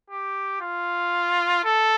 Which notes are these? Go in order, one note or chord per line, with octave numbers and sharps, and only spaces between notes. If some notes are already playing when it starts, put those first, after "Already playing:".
G4
F4
A4